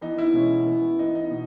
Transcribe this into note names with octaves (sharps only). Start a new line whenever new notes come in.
E3 B3 D#4
E4
B2 G#3 C#4
E3 B3
E3 B3 D#4
D#4
B2